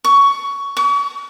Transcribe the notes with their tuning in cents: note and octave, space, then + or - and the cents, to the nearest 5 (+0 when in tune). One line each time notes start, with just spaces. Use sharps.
C#6 +15
C#6 +40